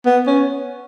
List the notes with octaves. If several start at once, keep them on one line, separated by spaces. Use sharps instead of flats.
B3
C#4